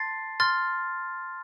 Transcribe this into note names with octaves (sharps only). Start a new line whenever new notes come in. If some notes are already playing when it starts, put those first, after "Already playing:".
Already playing: A5 C6 A6 C7
C6 F6 A6